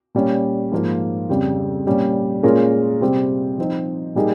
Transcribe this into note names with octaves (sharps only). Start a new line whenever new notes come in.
A#2 G3 C#4
G#2 F3 A#3 F4
F2 C#3 G3
A#2 G3 C#4
A#2 G#3 C#4 F4 A#4
C3 G3 C4 G4
F3 C4 D#4
A#2 G3 A#3 D#4 G#4